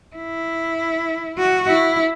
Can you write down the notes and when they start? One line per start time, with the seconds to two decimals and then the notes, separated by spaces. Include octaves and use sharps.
0.16 E4
1.38 F#4
1.68 E4